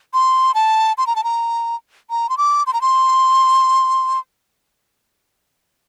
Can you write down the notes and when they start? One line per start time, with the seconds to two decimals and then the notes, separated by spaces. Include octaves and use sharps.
0.14 C6
0.55 A5
0.98 C6
1.07 A#5
1.16 A5
1.24 A#5
2.10 A#5
2.29 C6
2.38 D6
2.67 C6
2.73 A#5
2.82 C6